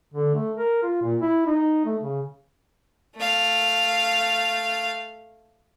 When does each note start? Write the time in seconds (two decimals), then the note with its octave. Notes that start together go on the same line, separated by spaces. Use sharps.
0.14 D3
0.34 A3
0.57 A#4
0.83 F4
1.02 A#2
1.22 E4
1.47 D#4
1.85 A3
2.02 C#3
3.17 A3 F5